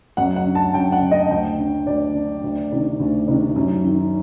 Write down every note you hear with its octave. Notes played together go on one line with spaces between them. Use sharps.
F#2 F#5
F#5
D3
A5
F#2 G5
F#5
D3
D#5
D2 G5
D3
D2 D5
D3
D2
C3 D#3
D2
C3 D#3
F#2
D#3